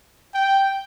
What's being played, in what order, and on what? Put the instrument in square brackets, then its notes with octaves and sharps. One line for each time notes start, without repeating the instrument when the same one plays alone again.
[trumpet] G5